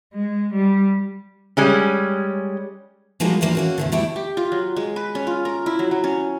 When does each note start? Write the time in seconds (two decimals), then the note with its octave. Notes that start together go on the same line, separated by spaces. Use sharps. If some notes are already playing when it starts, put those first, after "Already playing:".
0.14 G#3
0.53 G3
1.57 G3 G#3 C#4
3.20 F3 G3 G#3 A#3 D#4 F#4
3.41 A2 E3 F3 A#3 C4 D4
3.55 A#3 C#4 F#4
3.78 E2 A2 D3
3.92 G3 A3 E4 G5
4.16 G4
4.37 F4
4.52 F#3
4.76 G#3
4.96 B4
5.15 C#4
5.27 F4
5.45 A#4
5.66 E4
5.79 F#3
5.91 F#3
6.04 C#4